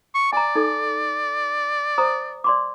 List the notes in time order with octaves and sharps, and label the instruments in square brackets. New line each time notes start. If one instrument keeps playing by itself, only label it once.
[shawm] C#6
[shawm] D5 [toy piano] G#5 A#5
[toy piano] D#4 A4
C5 A#5 D#6
D5 C6 D6